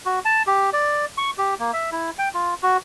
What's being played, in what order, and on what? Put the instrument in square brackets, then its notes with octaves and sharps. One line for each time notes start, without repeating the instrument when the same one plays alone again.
[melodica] F#4
A5
G4
D5
C#6
G4
A#3
E5
E4
G5
F4
F#4